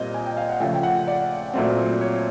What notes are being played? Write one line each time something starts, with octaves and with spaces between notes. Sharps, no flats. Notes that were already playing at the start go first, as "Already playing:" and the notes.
Already playing: A#2 G3 C4 D#5
G#5
G5
F5
F#5
C#3 F3 A3 G5
G5
F#5
D5
A#2 F#3 A3 C4
C#5